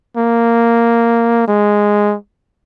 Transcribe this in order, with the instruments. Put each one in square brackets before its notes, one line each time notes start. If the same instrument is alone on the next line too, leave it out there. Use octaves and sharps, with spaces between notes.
[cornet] A#3
G#3